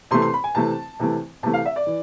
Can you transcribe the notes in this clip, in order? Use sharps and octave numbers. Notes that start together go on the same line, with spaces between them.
C3 E3 A3 C6
C6
B5
G#5
C3 E3 A3 A5
C3 E3 A3
C3 E3 A3 A5
F5
E5
D5
E3